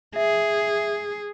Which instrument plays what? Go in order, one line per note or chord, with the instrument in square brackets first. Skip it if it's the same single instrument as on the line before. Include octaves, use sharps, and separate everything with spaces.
[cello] G#4 [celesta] E5